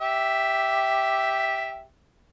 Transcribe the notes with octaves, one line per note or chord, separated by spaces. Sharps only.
G4 E5